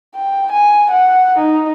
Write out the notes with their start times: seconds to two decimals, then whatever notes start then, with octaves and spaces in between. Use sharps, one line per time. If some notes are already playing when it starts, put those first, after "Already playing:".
0.16 G5
0.52 G#5
0.91 F#5
1.38 D#4